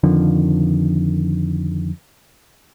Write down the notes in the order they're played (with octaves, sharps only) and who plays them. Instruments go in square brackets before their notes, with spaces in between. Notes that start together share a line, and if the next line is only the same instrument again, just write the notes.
[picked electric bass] F2 D3 D#3 F3